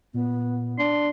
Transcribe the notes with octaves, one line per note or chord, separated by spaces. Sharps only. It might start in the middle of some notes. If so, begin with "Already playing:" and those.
A#2 B3
D4 C6